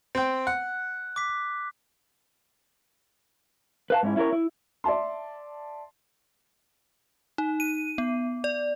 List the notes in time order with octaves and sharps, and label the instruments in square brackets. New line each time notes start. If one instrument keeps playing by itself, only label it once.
[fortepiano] C4 G5
[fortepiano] F#5 [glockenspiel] F#6
[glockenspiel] D6 B6
[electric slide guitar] B4 F5 A5
G#2 C#4 E4
C#4 E4 A4 A#4 C#5
E4
[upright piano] D5 E5 A5 C6
[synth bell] D#4
D#7
B3
D5